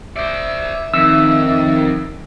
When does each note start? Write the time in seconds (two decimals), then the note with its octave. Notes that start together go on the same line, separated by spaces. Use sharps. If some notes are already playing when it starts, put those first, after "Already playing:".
0.16 C5 D5 E5
0.94 F2 D#3 E6